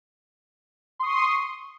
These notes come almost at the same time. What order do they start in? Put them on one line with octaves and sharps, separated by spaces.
C6 D#6 C#6